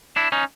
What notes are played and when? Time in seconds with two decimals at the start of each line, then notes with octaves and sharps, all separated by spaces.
0.16 D4 E4
0.32 C#4 D#4